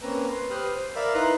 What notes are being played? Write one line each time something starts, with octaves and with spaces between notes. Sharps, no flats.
A#3 C4 C#4 B4 A#5 E6
B4 C6
G4 B4 C5 D#6 F6 F#6
C5
A#4 D5 E5 F5 B5 E6
D#4 E4 B4 A#5 C6 F#6